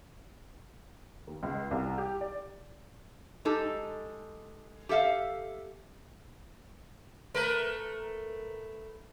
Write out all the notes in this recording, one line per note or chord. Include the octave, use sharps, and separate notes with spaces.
D#2
C#2
C2
G4
D5
G#3 D#4 G4 A4
G4 A4 E5 F5
A3 A#4 B4